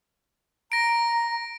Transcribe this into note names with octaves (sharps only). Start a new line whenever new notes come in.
A#5 A#6 D7